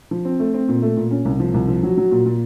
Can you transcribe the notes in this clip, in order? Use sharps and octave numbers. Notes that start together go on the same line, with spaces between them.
F3
C4
A3
C4
A#2
A3
A#2
C#4
C2
F3
C2
F3
F#3
F#3
A#2
A#2